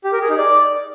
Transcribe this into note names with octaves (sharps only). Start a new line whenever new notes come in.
G4
A#4
G#4
D#4
D5